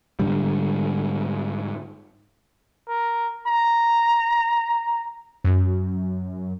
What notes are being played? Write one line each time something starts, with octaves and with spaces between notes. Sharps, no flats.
G#2 D3 G3
A#4
A#5
F#2